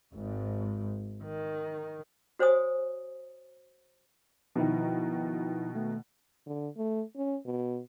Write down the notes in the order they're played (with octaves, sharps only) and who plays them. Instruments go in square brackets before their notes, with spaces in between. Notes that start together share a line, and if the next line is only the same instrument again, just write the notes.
[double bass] G#1 G#2
D#3
[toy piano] F#4 C5 C#5 G#5 D#6
[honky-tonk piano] B2 D#3 [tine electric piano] F3 D#4 E4
[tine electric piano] A3
[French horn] D3
A3
C#4
B2